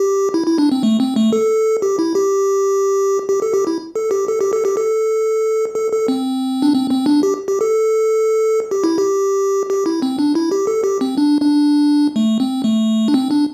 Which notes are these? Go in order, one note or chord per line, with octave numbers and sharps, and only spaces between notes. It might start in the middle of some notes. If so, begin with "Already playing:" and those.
Already playing: G4
E4
E4
D4
C4
A3
C4
A3
A4
G4
E4
G4
G4
A4
G4
E4
A4
G4
A4
G4
A4
G4
A4
A4
A4
C4
D4
C4
C4
D4
G4
G4
A4
G4
E4
G4
G4
E4
C4
D4
E4
G4
A4
G4
C4
D4
D4
A3
C4
A3
D4
C4
D4